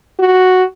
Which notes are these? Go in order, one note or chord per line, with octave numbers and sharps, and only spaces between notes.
F#4